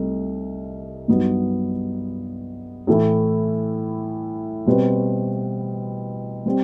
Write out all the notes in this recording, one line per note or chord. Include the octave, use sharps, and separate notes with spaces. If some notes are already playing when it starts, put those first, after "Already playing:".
Already playing: C2 C3 A3 D#4
G2 F#3 B3 D#4
A2 E3 A3 E4
B2 G3 C4 F#4 B4
G3 C4